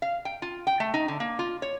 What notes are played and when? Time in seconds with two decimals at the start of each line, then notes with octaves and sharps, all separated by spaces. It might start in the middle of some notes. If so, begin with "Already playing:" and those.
0.02 F5
0.25 G5
0.42 F4
0.67 G5
0.80 A3
0.94 D#4
1.08 D3
1.20 A#3
1.39 F4
1.62 C#5